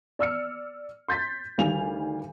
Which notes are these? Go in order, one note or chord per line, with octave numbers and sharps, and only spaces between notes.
D5 E6 F6 C#7
C6 G6 A6 B6
D2 D#3 G3 F5 G#5 F7